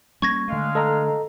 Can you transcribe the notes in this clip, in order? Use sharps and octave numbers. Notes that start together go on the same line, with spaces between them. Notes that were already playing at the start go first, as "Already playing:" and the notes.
G3 A#3 C#4 C#6 G#6 A#6
D3 G#3 A3 F5
A4 D#5 A#5